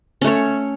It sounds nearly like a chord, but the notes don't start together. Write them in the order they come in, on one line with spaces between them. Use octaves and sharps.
C#4 A3 C#5